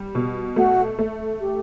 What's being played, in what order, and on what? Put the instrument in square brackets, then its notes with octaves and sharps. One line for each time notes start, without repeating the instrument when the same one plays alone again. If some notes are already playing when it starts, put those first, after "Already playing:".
Already playing: [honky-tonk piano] G3
B2
[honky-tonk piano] A3 [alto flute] F#4
[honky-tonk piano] A3
[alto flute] G4